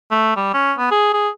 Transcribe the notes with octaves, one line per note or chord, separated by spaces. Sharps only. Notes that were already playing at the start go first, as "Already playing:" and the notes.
A3
G3
C#4
B3
G#4
G#4